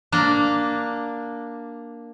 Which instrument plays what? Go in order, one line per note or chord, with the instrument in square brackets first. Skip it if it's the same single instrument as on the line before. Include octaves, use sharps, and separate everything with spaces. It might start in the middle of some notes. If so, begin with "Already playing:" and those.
[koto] A#3 D4